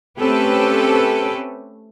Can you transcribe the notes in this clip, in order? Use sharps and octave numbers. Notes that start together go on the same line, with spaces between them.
A3 C4 C#4 G4 A4 B4